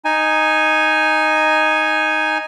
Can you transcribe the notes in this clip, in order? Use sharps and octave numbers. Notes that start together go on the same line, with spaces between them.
D#4 G#5